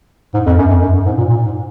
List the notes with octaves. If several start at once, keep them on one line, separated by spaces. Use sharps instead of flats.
G#2
F2
F#2
F2
F#2
F#2
G#2
A#2
A#2
G#2